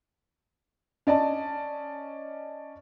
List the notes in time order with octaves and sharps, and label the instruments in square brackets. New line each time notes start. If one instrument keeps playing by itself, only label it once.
[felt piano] C#4 D5 D#5 A5